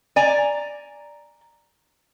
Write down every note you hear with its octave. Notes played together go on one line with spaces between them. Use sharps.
D5 G#5 A#5